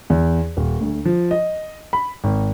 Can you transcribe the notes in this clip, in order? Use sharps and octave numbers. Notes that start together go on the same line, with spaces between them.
E2
D#1
D2
F3
D#5
B5
G#1